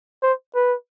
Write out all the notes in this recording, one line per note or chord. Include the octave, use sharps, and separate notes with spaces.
C5
B4